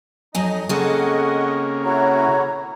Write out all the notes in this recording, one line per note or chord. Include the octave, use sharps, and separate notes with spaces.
F2 F#3 D#4 D#5 G#5
C#3 A#3 C4 G#4 A4 D#5 F#5 C#6
E4 F#4 C#5 A#5